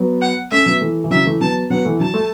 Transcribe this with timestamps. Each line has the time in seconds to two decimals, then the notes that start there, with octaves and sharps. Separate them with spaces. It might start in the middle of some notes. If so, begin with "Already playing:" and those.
Already playing: F#3 B3
0.22 F#5
0.51 A3 C#4 E5
0.66 F#3 B3
0.81 E3 A3
1.04 E3
1.11 C#3 F#3 E5
1.25 E3 A3
1.40 F#3 B3 A5
1.70 F#3 B3 F#5
1.85 E3 A3
2.00 F#3 A5
2.14 A3